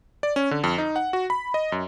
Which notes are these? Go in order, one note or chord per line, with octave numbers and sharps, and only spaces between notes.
D5
C#4
D3
F2
D#4
F#5
F#4
B5
D#5
F#2